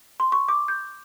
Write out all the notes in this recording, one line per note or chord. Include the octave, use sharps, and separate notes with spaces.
C6
C#6
D6
G6